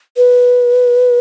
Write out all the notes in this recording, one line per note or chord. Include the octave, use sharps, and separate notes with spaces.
B4